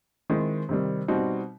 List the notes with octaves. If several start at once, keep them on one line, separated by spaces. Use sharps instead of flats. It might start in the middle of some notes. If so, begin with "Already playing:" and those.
D#3 G#3 C4 E4
C3 D#3 G3
B2 G3 C4 D#4 F#4